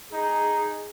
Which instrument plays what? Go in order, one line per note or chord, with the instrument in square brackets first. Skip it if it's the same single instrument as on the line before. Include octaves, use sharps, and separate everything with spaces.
[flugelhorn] D#4 [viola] G#4